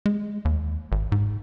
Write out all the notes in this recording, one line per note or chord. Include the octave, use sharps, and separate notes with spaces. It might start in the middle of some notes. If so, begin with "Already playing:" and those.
G#3
D#2
G#1
G#2